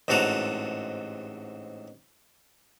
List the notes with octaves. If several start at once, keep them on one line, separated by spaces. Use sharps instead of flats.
A1 G#2 C3 F#4 A4 A#5